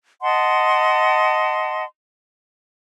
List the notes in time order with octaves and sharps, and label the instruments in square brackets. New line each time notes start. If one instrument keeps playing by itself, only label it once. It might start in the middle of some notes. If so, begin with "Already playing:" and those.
[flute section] D#5 F#5 A5 C6